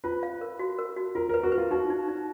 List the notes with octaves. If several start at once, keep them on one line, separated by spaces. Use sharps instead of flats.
F4 B4
F5
A#4
F#4
A#4
F#4
F4 A#4
A#4 B4
F#4
B4
F4
D#4 F#4
D#4
D#4